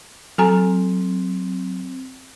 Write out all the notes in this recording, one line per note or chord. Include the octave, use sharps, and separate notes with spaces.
F#3 C4 A4 G#5 A#5